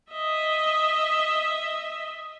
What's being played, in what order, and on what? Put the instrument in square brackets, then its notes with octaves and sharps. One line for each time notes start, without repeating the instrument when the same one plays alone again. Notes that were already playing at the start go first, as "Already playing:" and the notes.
[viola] D#5 E5